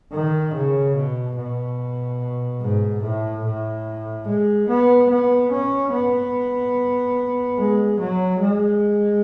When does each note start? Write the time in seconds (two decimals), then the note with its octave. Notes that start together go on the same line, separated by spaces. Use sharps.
0.12 D#3
0.54 C#3
0.96 B2
1.37 B2
2.61 G#2
3.03 A2
3.44 A2
4.27 G#3
4.68 B3
5.10 B3
5.51 C#4
5.92 B3
7.59 G#3
8.00 F#3
8.41 G#3